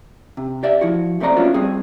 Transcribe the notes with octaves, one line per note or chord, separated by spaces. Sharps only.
C3
G4 D5 E5
F3 E4 F#4
F#2 A3 C4 A#4 D5 A#5
A3 B3 C#4 D4 F4 F#4
G3 C4 G#4